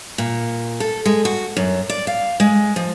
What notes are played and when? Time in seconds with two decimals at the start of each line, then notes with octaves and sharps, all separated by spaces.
0.18 A#2
0.80 A4
1.06 G#3
1.25 F#4
1.57 F#2
1.90 D5
2.07 F5
2.40 G#3
2.76 F3